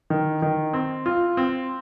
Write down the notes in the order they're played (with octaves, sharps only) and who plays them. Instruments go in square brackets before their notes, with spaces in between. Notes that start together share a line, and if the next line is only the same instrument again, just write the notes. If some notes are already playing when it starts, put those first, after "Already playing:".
[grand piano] D#3
D#3
C4
F4
C4